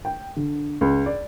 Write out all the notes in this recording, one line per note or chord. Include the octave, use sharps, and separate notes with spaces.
G5
D3
C#2
D5